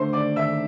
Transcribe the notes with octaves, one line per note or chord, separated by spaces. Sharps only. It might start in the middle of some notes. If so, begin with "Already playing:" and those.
Already playing: D3 A3 C5 C6
D5 D6
E5 E6